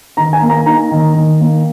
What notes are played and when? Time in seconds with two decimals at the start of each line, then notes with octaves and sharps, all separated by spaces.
0.17 D#3 A#5
0.33 G#5
0.42 A#3
0.49 A#5
0.66 D#4 A#5
0.91 D#3
1.15 D#3
1.40 A#3